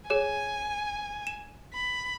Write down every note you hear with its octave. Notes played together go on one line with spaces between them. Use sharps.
G#4 C#5 G#5
E7
B5